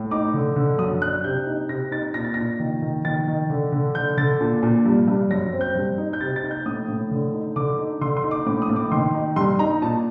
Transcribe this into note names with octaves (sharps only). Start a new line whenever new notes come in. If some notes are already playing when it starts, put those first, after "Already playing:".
Already playing: A2
D#4 D6
D3
D3
F#2 D#6
D4 F#6
C3 G6
D#4
C3 A#6
D#4 A6
A#2 A#6
A6
A#2 A#6
D#3
D#3
D#3 A6
D#3
D3
D3
D3 G6
D3 A6
A#2
A#2
G2
G2
F#2 A#6
C4
G6
G2
D#4
G6
C3 A6
A6
D#4
G6
A2 D#6
A2
D3
D#4
D3 D6
D#4
D3 C6
C6
D#4
D6
A2 D6
D#6
A2
D6
D#3 C6
D#4
G2 C6
D#4 A#5
A#2 A5